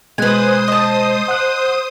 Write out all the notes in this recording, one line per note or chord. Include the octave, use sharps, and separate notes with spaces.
B2 G#3 B4 C5 G#5 D#6 F#6
D#5 A5
F#5 F#6